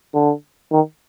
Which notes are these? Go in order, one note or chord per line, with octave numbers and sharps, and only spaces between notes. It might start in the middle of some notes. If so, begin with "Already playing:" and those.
D3
D#3